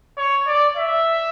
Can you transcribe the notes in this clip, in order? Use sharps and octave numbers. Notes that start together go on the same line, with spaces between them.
C#5
D5
E5